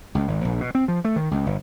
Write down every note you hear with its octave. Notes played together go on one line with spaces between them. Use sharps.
C#2
G#1
A#1
B2
C4
F3
A3
D#3
C#2
G1